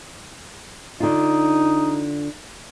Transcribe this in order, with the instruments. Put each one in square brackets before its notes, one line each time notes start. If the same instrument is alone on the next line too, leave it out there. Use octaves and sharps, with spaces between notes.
[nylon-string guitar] D3 F4 [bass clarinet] D#4